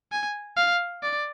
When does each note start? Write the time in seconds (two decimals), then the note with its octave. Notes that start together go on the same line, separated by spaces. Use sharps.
0.12 G#5
0.57 F5
1.03 D5